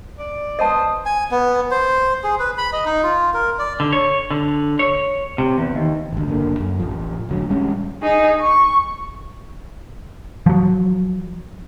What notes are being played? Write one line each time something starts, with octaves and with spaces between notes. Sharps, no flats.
D5
B3 C5 D#5 A5 D#6
G#5
B3
C5
G#4
B4
B5
D#5
D#4
F4
A#4
D5
D3
C#5
D3
C#5
C3
E2
D#2
G#1 D2
F#1 D3 A#3
F#2
A1 F3
F1 D2 F#3
A1 G3 G#3 C#4
D#4 G#4
C#6
F3 F#3